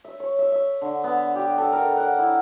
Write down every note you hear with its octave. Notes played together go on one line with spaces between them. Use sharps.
E5
C#5
E5
E5
D3
B3
G4
A4
A#4
F#5
E4